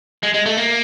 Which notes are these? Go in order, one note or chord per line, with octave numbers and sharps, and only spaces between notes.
G#3
G#3
A3
A#3